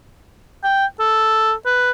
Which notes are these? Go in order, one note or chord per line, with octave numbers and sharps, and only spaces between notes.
G5
A4
B4